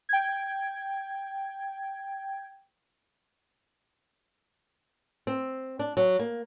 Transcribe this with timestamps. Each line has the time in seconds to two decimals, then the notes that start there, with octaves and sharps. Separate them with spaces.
0.09 G5 G#6
5.27 C4
5.79 D4
5.97 F#3
6.19 A#3